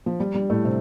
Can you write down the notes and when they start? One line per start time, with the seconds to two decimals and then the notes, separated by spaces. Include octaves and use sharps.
0.06 F3
0.20 G3
0.35 G3
0.50 A2 A3
0.65 C3 C4